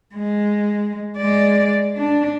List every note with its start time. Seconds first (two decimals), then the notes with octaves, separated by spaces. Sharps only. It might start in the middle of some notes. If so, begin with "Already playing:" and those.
0.15 G#3
1.17 G#3 D5
1.97 D4